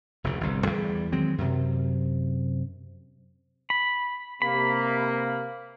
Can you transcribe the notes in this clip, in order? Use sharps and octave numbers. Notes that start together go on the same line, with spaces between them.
F1 D2 C#3
G1 C2
E2 G3
D#3 F#3 G#3 C4
F#2 C3
B5
C3 A#3 B5